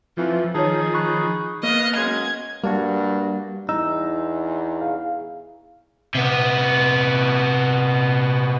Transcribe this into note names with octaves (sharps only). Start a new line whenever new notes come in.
F2 E3 F3
D#3 F3 D#4 G#4 C#5 A5
B5 C#6 F#6
A#3 B3 D#5 F5
F#2 G#3 G#6
G2 G3 A#3 D4 F#4
E2 D#4 E6
G#4 F5
C3 B3